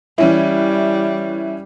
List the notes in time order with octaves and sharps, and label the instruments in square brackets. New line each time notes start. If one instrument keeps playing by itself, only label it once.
[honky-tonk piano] E3 C#4 E4 [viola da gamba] G3